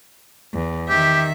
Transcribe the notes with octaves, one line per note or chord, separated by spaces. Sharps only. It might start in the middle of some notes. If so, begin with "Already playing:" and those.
E2
D#3 G4 E5